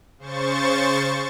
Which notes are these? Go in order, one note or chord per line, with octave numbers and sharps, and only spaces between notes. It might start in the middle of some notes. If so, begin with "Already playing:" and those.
C#3 C5 C#6 A6